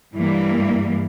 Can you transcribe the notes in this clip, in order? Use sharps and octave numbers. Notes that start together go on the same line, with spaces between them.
G2 E3 G3 A#3